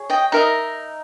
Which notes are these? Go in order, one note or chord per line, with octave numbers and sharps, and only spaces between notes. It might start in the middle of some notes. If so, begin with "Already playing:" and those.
Already playing: G#4 C#5
D#5 G5
D#4 A#4 D#5 E5